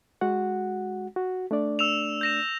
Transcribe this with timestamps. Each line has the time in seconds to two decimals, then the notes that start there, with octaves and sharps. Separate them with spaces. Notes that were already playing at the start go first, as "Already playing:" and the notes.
0.21 G#3 F#4 F#5
1.16 F#4
1.51 A3 D4 D5
1.79 E6 E7 F7
2.21 G6 A#6 E7